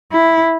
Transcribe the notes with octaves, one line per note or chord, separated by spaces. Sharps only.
E4